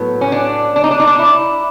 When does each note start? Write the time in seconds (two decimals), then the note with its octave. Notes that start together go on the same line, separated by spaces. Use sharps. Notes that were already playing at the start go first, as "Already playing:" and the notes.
Already playing: A2 F#3 B3
0.21 C#4
0.32 D4
0.76 D4
0.84 D#4
0.91 D4
1.00 D#4
1.07 D4
1.19 E4